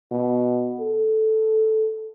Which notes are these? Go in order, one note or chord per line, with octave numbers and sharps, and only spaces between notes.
B2
A4